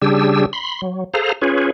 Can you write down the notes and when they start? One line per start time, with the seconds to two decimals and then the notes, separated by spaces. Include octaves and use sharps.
0.02 C#3 G3 D4 G4 G#4 E6
0.53 B5 C6
0.82 F#3
1.14 G#4 A4 C5 F5 A#5
1.42 C#4 F4 G#4 B4 C#5